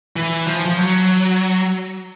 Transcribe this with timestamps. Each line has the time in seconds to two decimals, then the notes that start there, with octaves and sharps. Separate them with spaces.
0.16 E3
0.47 F3
0.66 F3
0.77 F#3